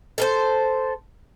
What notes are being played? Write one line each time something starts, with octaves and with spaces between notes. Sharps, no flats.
A4 A#4 C5